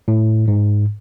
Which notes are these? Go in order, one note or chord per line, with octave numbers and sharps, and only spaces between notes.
A2
G#2